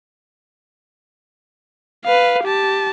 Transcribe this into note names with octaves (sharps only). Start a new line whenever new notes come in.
B4 F5
G4 A5